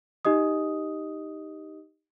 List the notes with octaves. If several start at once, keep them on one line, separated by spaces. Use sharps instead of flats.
D#4 G4 D#5 D#6